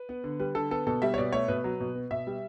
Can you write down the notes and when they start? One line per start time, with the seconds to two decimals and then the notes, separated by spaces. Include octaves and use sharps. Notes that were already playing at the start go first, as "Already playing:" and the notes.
Already playing: B4
0.09 B3
0.24 D3
0.39 G3 B4
0.55 D3 A4
0.71 B3 A4
0.87 B2 A4
1.02 G3 E5
1.14 C#5
1.18 B2 D5
1.32 A3 C#5
1.48 B2 B4
1.64 F#3
1.80 B2
1.95 B3
2.11 B2 E5
2.27 G3